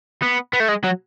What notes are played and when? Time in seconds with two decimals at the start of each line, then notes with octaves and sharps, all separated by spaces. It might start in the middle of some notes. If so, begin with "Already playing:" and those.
0.22 B3
0.53 B3
0.60 A3
0.69 G#3
0.84 F#3